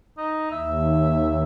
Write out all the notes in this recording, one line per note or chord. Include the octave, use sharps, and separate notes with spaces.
D#4
D#2 E5